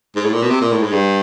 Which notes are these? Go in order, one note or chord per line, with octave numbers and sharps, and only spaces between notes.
G#2
A2
A#2
B2
C3
A#2
A2
G#2
G2